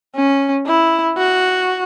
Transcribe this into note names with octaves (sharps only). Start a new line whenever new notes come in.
C#4
E4
F#4